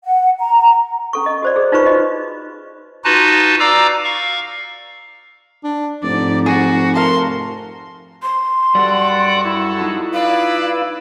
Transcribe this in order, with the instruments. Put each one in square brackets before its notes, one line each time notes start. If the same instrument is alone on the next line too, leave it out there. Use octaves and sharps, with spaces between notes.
[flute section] F#5
A#5
[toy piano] C#4 A4 C#6
D#5
F#4 C5 D5
G#4
D#4 F4 B4 C5 B5 C#6
F#4 D#5
[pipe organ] D#4 F4 F#4 B4 A5
D5 F5 A#5 D6 E6
F5 C#6
[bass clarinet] D4
[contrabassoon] F1 [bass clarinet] G#2 [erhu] D5
[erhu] F#4 [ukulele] G#4
[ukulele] A#4 F5 A5 [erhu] C6
[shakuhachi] C6
[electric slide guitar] F#2 G3 G4 [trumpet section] F#4 A4 [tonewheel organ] D5 F#5
[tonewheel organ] E4
[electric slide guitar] D#4 F4
[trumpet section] B4 D5 [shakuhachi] F5